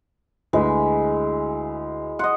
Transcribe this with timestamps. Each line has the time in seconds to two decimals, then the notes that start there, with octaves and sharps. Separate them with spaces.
0.53 D2 G#3 E4 B4
2.19 D#5 F#5 C6